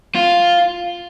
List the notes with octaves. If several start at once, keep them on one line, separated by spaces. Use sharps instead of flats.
F4